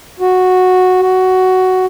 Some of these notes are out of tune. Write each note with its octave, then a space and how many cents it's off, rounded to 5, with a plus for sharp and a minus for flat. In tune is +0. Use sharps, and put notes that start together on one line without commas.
F#4 -5
F#4 +10